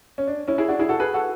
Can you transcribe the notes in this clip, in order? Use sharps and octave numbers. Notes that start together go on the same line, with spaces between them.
C#4
D4
C#4 E4
E4 G#4
D4 F#4
E4 G#4
F#4 A4
G#4 B4
F#4 A4